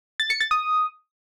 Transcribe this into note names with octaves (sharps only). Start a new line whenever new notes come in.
A6
C#7
A6
D#6